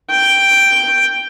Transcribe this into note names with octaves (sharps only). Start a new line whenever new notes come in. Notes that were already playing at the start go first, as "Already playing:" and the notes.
G5